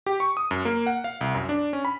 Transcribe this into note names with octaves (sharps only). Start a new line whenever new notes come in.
G4
C#6
D#6
F#2
A#3
F#5
F5
C2
F#2
D4
C#4
B5